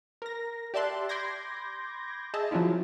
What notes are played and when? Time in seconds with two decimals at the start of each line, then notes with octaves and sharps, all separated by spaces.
0.22 A#4 A#6
0.74 G4 D5 E5 A5 C6 F#6
1.09 B5 C6 D6 G6 G#6 A#6
2.34 G#4 D#5 E5 A5
2.51 F3 F#3 C#4 E4 F4